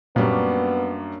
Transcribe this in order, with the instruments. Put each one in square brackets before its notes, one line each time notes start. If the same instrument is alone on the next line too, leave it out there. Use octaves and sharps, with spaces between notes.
[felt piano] F#2 G3 [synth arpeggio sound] A#2 [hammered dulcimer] A#3 C#4 D4 [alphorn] B3